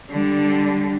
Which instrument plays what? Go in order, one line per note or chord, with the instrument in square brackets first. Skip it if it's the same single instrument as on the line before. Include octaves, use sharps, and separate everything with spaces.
[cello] D3 G3